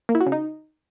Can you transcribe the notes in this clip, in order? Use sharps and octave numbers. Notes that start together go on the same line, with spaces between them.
A#3
E4
F#4
C#3
D#4